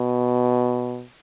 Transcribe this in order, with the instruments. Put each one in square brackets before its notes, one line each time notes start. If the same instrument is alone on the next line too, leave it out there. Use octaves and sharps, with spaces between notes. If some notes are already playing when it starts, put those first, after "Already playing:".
Already playing: [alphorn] B2